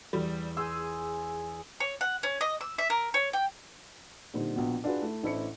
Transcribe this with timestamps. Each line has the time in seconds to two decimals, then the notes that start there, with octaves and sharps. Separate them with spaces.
0.13 E2 G3
0.57 G#4 C6 E6 G6
1.80 C#5
2.01 F#5
2.23 C#4
2.41 D#5
2.61 E6
2.78 E5
2.90 A#4
3.14 C#5
3.33 G5
4.34 A#2 D3 G3 C4 D#4
4.55 A#1 B2 B3 F#4
4.84 D4 F4 F#4 G#4 B4
5.02 A3 E4
5.23 A1 D4 E4 A4 C5 C#7